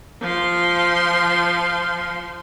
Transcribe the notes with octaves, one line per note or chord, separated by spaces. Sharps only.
F3 C6